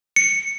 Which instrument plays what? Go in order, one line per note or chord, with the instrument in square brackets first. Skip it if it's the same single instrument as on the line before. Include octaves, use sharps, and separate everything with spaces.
[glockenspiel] C#7